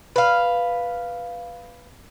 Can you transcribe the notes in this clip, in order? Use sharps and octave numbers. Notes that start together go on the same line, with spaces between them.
B4 F5